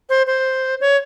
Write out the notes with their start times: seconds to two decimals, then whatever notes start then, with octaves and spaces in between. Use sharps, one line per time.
0.10 C5
0.27 C5
0.81 C#5